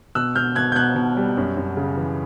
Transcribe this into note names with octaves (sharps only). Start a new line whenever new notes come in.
B2 E6 F#6
B2 F6 G6
B2 F#6 G#6
G6
B2 F#6 G#6
B2
G3
F#2
F#2
C#3
E3